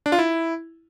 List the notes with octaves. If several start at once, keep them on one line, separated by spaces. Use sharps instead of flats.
D4
F4
E4